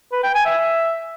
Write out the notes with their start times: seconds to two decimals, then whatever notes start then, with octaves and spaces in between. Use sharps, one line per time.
0.12 B4
0.23 G5
0.34 G#5
0.46 E5